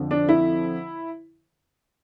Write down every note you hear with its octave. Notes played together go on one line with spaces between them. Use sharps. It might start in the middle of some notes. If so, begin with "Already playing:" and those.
Already playing: F2 D3 F3
D4
E4